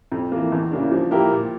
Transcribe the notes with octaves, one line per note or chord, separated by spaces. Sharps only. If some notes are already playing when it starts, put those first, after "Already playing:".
F2
E3 A#3
E2
C#3 E3 A#3 D4
F3
A#3 E4 G4 A#4
A#2